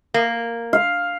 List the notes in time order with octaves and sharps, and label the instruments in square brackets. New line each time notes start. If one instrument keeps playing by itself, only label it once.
[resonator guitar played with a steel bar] A#3
[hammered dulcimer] F5